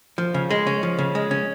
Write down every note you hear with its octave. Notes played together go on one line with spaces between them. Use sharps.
F3
C#3
G#3
C#4
F3
C#3
G#3
C#4